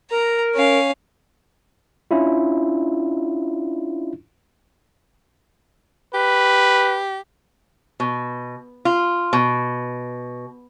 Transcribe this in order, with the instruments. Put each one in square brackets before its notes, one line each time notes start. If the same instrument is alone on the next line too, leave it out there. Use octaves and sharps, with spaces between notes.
[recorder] A#4 [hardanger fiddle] A#5
[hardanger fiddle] C#4 F5
[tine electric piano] C#4 D4 E4 F4
[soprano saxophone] G4 [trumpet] B4
[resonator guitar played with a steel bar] B2
F4
B2